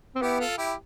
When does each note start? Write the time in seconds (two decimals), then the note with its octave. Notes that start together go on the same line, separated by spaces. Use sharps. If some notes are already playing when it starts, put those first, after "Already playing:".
0.15 C4
0.22 B3 E4 G4
0.40 F4 A4
0.58 E4 G4